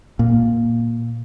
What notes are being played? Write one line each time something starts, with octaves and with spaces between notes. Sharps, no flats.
A#2